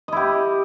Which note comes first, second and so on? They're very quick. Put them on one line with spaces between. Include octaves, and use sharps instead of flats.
D#5 E4 G4